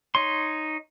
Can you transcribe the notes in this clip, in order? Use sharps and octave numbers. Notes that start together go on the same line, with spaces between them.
D#4 C#5 C6